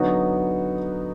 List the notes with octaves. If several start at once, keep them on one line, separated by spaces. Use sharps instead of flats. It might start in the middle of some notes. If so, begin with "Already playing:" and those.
Already playing: D3 F#3 B3 D#4 F#4